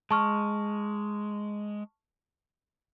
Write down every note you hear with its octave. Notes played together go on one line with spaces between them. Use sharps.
G#3 A5 C#6 F6